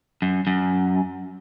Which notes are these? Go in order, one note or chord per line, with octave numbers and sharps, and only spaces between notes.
F#2
F#2